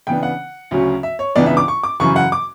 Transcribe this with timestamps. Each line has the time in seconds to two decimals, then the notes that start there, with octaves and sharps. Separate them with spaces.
0.07 C#3 E3 B3 D4 G5
0.23 F#5
0.71 D2 C#3 F#3 C#4
1.03 E5
1.19 C#5
1.36 C#2 C#3 E3 B3 D4 D5
1.46 E5
1.57 D6
1.68 C#6
1.83 D6
2.00 F#2 C#3 E3 C#6
2.16 F#5
2.32 D6